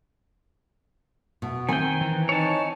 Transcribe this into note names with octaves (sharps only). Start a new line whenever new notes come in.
B2
D#3 C4 G5 G#5
E3
D#4 C#5 G#5 A5